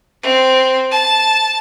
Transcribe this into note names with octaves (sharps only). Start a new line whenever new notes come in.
C4
A5